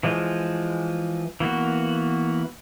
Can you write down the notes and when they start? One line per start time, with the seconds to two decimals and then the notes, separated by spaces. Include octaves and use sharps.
0.03 E3 F3 G#3
1.40 E3 A#3 B3 F#4